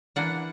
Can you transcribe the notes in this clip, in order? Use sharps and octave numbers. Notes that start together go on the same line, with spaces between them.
E3 A#3 D4 F#5